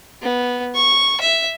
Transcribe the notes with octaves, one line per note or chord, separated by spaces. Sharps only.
B3
C#6
E5